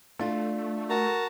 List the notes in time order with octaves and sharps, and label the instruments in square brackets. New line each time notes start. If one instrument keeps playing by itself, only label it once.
[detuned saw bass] A3 [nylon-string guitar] D4 F4
[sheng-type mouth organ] F#4 A5 A#5 [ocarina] A#4